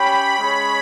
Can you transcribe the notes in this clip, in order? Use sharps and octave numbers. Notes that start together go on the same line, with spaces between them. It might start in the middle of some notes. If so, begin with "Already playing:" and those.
Already playing: C#4 G4 C#5 G5 B5
G#3 C#4 G#4 C#5 B5